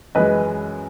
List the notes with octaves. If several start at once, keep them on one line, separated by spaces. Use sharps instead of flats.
F#2 E3 G#3 B4 D#5